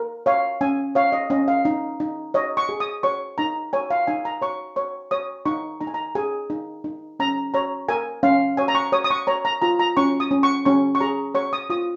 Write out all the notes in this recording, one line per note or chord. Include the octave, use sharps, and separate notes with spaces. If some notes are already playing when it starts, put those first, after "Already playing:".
Already playing: A#4
C#5 F5
C#4 G#5
C#5 F5
D#5
C#4 D#5
F5
D#4
D#4
C#5 D#5
C#6
G#4
D#6
C#5 C#6
D#4 A#5
C#5 G#5
F5
D#4 G#5
A#5
C#5 C#6
C#5 C#6
C#5 D#6
D#4 C#6
D#4 A#5
G#5
A#5
G#4 G#5
D#4
D#4
C#4 A#5
C#5 A#5
A#4 G#5
C#4 F5
C#5 G#5
A#5
C#6
C#5 D#6
D#6
C#6
C#5 A#5
A#5
F4 A#5
A#5
C#4 C#6
D#6
C#4
C#6
C#4 C#6
C#6
G#4 A#5
C#5 C#6
D#6
F4 D#6